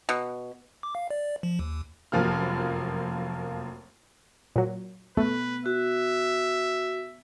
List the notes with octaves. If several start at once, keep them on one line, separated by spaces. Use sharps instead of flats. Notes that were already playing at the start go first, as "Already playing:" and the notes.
B2
D6
F5
D5
F3
D#2
F1 F#2 F3 A#3 F6
A#2 F#3
A3 B3 B4
F#4 E5